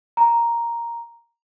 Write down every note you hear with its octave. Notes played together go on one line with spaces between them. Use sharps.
A#5